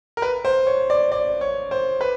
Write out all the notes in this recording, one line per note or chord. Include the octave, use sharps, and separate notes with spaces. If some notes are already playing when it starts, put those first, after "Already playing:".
A#4
B4
C5
C#5
D5
D5
C#5
C5
B4